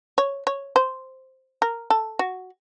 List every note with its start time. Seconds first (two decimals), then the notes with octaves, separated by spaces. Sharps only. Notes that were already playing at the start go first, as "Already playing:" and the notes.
0.18 C#5
0.47 C#5
0.76 C5
1.62 A#4
1.90 A4
2.19 F#4